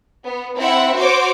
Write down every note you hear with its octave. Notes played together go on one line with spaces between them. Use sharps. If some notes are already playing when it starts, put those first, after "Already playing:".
B3
C4 E4 E5 F#5
F#4 C5 C#5 D6